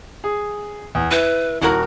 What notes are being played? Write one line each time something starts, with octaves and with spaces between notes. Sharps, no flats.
G#4
E2
E4 B4
D#1 E4 F#4 A#4